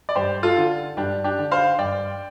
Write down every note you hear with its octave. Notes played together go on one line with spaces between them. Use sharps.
D5
G2 G4 C5
F4 A4
D3
G2 D4 G4
D4 G4
D3
C5 F5
G2 D5 G5